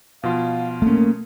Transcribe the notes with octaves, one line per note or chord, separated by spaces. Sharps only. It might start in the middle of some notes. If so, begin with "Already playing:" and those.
B2 F3 F4 F5
A3 A#3 C#4